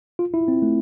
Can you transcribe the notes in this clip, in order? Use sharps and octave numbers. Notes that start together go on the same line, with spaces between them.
F4
E4
C4
A3